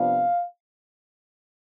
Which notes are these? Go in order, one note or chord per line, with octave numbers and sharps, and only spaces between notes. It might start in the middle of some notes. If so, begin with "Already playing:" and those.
Already playing: C3 F3 B3 D4 F4 F5